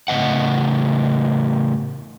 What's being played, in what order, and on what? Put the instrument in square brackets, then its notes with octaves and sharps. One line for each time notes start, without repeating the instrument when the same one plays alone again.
[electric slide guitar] A2 C#3 F3 D#5 F#5